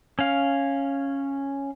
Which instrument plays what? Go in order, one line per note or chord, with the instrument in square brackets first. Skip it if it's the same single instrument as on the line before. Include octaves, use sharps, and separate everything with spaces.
[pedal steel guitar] C#4 F5